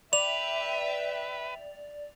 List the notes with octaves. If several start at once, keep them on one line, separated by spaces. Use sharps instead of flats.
B4 D5 E5 G5 F7